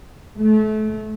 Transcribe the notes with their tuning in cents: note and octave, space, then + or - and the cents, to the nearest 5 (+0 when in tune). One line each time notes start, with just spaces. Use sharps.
A3 -30